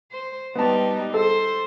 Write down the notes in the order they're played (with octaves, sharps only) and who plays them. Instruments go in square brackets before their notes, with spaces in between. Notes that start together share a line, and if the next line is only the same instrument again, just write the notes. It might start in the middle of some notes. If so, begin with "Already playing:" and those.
[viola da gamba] C5
[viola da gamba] G3 D#4 G4 [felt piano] B3 A5
[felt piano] A4 [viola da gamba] C5